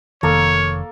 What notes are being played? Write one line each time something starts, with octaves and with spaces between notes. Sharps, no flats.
F1 D#3 A#3 A4 C#5